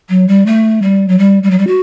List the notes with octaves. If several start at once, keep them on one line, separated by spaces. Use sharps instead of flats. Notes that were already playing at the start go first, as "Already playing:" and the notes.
F#3
G3
A3
G3
F#3
G3
G3
F#3
G3
F#4